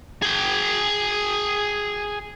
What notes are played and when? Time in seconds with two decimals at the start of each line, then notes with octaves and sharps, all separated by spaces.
0.22 G#4 G5